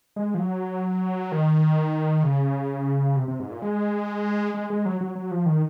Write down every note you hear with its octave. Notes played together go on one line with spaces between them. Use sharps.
G#3
F3
F#3
D#3
C#3
C3
C3
G#2
A#2
G#3
G#3
G#3
F#3
F#3
F#3
F3
D#3